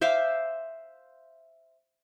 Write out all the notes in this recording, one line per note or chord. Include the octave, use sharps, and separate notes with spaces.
C5 E5 F5 D6